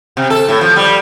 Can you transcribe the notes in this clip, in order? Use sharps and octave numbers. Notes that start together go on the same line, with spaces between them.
C3
A4
A2
F3
G3